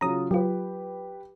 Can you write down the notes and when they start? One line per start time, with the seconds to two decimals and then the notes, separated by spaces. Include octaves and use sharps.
0.01 C#3 F#3 F4 A#5 D#6
0.31 F#3 F4 G4 B4